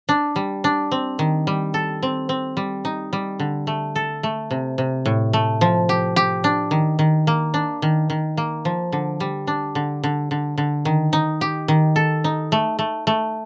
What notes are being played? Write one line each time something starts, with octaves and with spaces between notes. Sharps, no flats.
D4
G3
D4
C4
D#3
G3
A4
C4
C4
G3
D#4
G3
D3
A3
A4
A3
C3
C3
A2
A3
F3
G4
G4
D4
D#3
D#3
A#3
D4
D#3
D#3
A#3
F3
D3
G3
D4
D3
D3
D3
D3
D#3
D#4
G4
D#3
A4
D#4
A3
A3
A3